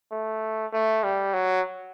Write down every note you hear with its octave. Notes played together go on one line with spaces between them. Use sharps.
A3
A3
G3
F#3